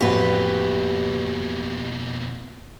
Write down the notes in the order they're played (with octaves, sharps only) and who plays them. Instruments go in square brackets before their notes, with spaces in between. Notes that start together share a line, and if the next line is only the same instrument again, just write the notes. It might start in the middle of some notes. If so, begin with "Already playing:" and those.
[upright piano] A1 F#4 [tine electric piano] F2 [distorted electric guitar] B2 A#3 [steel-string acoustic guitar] G4 B4